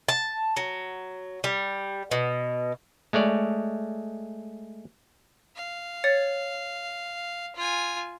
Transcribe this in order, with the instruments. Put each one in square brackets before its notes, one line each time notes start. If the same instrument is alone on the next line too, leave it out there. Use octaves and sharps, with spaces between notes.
[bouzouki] A5
F#3
G3
B2
[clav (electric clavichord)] G#3 A3 C#5 D5
[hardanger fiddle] F5
[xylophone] C#5 A6 C#7
[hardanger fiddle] F4 G#5